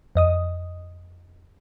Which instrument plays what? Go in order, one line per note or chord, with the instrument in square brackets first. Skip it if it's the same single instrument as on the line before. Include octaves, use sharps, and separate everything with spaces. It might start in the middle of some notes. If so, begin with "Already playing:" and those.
[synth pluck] F2 D#5 D#6